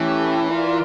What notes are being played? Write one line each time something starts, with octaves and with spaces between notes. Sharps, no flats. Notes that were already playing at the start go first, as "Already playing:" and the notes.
Already playing: E3 A3 C#4 G4
F4 A#4 D5